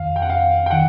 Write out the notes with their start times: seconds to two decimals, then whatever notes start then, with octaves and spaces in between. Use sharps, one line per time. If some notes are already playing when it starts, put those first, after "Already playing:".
Already playing: F2 D#3 F5
0.16 G5
0.22 F#5
0.30 F5
0.66 G5
0.71 D#3 F#5